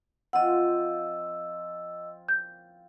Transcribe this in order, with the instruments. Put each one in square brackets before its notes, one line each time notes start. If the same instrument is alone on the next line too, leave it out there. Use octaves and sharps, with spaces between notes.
[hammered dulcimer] F3 C4 F4 [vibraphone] D#5 E6 [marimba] F#5
[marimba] G6